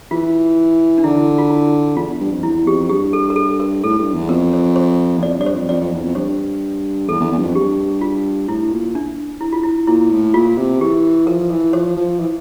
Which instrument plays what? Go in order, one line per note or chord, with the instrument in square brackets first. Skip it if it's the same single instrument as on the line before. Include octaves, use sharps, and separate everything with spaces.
[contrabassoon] E3 [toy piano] F4
[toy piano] D4
[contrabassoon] D3 [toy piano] E4
[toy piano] F4
E4
[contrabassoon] E2 [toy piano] F4
[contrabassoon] G2
F2
[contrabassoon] E2 [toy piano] E4
[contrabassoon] F2 [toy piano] G4
[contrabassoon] G2 [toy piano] G4
[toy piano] A4
A#4
A4
A#4
[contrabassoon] A2 [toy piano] A4
[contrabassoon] G2
E2
[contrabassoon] F2 [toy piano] A#4
[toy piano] C5
C5
[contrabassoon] E2
[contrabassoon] F2 [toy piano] D5
[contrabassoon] G2 [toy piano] D5
[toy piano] C5
[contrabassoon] F2
[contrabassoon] F2 [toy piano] D5
[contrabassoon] F2
E2
F2
[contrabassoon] G2 [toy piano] C5
[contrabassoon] E2 [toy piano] A4
[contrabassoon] E2
E2
G2
F2
[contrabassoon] G2 [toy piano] G4
[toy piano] F4
[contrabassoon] A2 [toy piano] E4
[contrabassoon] A#2
[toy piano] D4
E4
F4
E4
[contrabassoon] A#2 [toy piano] E4
[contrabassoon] A2
[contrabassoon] A#2 [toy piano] F4
[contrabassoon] C3
[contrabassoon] E3 [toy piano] G4
[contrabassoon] F3 [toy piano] A#4
[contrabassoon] E3
[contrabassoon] F3 [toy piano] C5
[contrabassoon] F3
E3